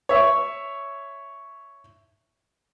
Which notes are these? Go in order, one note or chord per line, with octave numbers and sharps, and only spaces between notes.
C#5 E5